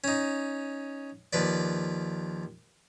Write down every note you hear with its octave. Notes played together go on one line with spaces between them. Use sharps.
C#4 D#4
D#2 F3 B4 D5